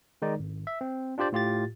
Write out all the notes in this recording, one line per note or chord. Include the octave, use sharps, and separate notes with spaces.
D#3 G#3 D#4 D5
G#1
E5
C4
D4 F4 G4 C5 D5
A2 F4 G4 A6